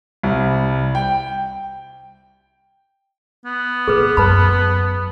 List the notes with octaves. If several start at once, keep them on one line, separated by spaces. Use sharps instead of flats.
C2
G5
B3
A#2 G#4 B4
F#2 B4 A5 B5